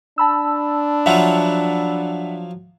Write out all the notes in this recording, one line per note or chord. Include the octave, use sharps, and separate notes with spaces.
D4 A5 B5 E6
F3 F#3 F4 E5 F#5